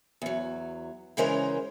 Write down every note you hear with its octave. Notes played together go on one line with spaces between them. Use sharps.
E2 F#3
C#3 E3 G#3 C#4 A#4 C5